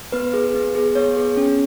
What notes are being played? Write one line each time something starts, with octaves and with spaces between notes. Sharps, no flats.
B3 B4
G#4
B3
G#4
B3 C#5
G#4
C#4